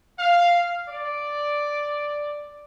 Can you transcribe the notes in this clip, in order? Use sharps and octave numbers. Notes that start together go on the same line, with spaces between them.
F5
D5